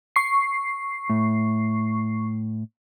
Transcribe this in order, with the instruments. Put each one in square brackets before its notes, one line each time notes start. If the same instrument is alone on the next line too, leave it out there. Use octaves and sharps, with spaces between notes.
[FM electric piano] C#6 C7
[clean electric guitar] A2